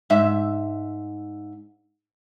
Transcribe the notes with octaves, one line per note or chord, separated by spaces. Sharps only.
G#2 E5